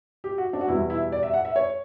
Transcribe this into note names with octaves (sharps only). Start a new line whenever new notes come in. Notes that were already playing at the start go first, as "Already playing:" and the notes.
G4
F#4
D4
F#4
E2 B2 G3 E4
E4
D5
E5
F#5
E5
C#5